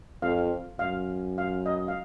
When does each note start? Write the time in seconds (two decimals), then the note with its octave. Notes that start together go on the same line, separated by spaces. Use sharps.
0.22 F2 F5
0.79 F#2 F5
1.38 F5
1.66 D#5
1.88 F5